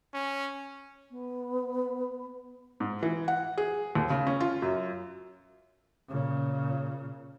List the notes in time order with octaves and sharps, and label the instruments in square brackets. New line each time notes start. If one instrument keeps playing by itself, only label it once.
[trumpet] C#4
[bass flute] B3
[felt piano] G#2
E3
F#5
G#4
D#2
C#3
C#4
F4
F#2
[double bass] A#2 C#3